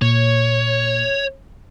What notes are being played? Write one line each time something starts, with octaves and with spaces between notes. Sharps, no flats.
A#2 C#5